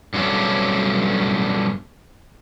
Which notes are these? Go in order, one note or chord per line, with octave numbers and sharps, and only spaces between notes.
G2 B2 F#3 A3 C#4 D4